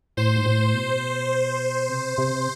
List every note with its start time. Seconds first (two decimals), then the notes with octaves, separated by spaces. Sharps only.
0.17 A2 C5
0.36 G#2
0.46 A2
0.74 B2
1.89 C3
2.18 C3